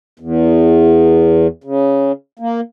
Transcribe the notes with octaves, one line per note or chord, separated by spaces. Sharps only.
E2
C#3
A#3